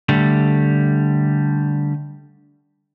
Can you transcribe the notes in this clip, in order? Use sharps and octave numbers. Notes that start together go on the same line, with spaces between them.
D3 G3 A3